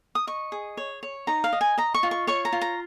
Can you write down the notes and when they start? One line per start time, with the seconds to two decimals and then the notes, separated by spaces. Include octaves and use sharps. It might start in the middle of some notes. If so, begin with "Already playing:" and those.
0.15 D#6
0.27 D#5 C#6
0.52 G#4
0.77 C#5
1.03 C#5
1.27 D#4 A#5
1.44 F5
1.53 D#5
1.61 G#5
1.78 D#5 A#5
1.95 C#6
2.03 F4
2.11 C#6
2.27 C#5 C#6
2.45 A#5
2.53 F4
2.61 A#5